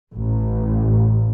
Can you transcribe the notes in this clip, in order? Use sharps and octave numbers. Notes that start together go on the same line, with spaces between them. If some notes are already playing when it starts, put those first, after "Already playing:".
A1